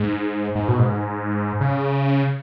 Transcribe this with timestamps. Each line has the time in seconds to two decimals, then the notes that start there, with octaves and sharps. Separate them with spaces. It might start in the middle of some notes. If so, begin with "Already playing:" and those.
Already playing: G#2
0.55 G#2
0.68 B2
0.79 G#2
1.61 C#3